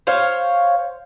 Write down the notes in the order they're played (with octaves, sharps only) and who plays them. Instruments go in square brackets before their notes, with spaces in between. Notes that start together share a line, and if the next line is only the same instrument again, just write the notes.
[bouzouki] C5 C#5 F5